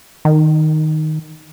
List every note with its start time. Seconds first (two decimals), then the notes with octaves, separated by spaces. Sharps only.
0.25 D#3